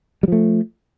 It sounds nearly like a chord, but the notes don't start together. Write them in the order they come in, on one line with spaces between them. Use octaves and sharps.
G3 F3 A3